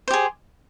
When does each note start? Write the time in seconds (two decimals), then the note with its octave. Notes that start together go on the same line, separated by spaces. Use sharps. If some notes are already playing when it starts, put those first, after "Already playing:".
0.08 C5
0.11 G4
0.13 G#4